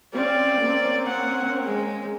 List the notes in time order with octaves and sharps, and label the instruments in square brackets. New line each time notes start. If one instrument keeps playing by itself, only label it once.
[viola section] C4 C#4 F5 [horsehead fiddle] D5
[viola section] A#3 C4 C#4
[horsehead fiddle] F#5
G#3